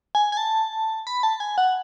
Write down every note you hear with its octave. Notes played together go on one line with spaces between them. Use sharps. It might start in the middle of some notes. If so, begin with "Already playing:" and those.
G#5
G#5
A5
B5
A5
G#5
F#5